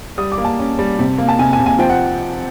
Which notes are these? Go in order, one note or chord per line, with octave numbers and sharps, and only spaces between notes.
G3 D#6
D6
A#3
A5
C#4
G3
C3
A#3
A5
C3 G#5
G#5
C3
G#5
F3 G5
F#5